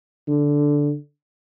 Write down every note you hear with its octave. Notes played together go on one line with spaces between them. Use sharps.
D3